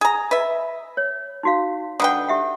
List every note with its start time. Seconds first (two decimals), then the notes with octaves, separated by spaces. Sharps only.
0.01 G#4 A#5
0.31 B4 D#5 E5
0.97 C#5
1.43 D#4 F#4 F5
2.00 D3 B4 F#5 G5 D#6
2.28 G4 E5 F#5